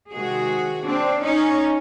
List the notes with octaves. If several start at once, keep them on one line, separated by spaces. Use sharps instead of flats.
C3 D#3 G#3 F#4 G#4
C4 D4
C#4 D#4